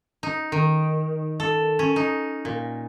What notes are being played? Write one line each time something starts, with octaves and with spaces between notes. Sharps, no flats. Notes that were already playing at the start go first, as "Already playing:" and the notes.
D#4
D#3
A4
C#4
D#4
A#2